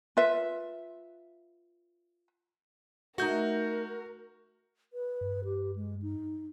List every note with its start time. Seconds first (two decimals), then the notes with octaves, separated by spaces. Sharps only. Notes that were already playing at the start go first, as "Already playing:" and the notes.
0.17 F4 B4 E5
3.18 A3 D#4 F#4 A#4 G6
4.93 B4
5.21 G2
5.45 G4
5.76 G#3
6.02 D#4